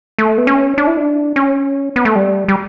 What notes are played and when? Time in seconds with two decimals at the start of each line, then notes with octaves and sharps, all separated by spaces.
0.18 A3
0.38 B3
0.47 C#4
0.78 D4
0.87 E4
0.97 D4
1.36 C#4
1.96 B3
2.05 A3
2.16 G3
2.48 G3